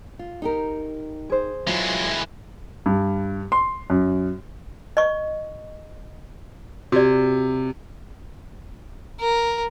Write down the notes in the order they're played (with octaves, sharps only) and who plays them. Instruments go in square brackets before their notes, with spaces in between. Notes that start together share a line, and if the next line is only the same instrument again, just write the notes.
[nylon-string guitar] F4
D#4 G4 A#4
[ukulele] G#4 C5
[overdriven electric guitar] E3 G#3 [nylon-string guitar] F#3 F4
[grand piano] G2
C6
F#2
[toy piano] D#5 C#6
[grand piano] C3 [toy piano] F#4 D5
[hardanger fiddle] A#4